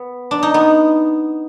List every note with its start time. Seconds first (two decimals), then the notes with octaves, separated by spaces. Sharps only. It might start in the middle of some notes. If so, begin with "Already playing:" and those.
Already playing: B3
0.31 D4
0.43 D#4
0.54 B3